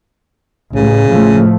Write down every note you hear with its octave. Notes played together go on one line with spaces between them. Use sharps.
A1 C#3
A2 F3 A3